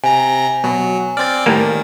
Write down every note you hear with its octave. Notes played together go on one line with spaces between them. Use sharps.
C3 G#5 A#5
B2 F#3
C4 D5 F6 A6
A2 D#3 G3 A#3